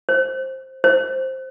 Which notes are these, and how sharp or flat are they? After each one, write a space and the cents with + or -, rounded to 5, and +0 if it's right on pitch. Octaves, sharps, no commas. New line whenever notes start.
C5 +10
C5 +5